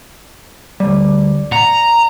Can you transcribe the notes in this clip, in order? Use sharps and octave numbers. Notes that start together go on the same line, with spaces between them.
D2 G3 D5
F#5 A#5